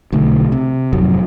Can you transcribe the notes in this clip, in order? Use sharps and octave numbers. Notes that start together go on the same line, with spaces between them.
B1 D3 A3
C3
G#1 F2 C3 F#3